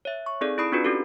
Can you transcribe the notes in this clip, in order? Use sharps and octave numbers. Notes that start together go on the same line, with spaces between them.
C#5 E5
C#6
C4 D#4 G#4 A4 D5
E4 D5 B5 D#6 C7 D7
C4 D4 D#4 F4 F#4 B4
C#4 F#4 G4 A4